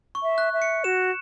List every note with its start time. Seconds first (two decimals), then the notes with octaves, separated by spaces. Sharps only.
0.15 C#6
0.23 E5
0.38 F#6
0.53 E5
0.62 C#7
0.84 F#4 E7